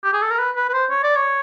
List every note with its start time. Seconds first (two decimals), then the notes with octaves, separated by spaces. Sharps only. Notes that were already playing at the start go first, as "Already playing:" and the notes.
0.04 G4
0.13 G#4
0.22 A4
0.31 A#4
0.39 B4
0.56 B4
0.69 B4
0.73 C5
0.90 C#5
1.03 D5
1.16 C#5